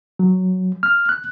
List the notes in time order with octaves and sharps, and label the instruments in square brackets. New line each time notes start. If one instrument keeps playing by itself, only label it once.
[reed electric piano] F#3
F6
F#6